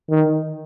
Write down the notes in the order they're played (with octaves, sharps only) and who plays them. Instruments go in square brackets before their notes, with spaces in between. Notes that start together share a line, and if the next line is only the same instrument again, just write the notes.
[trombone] D#3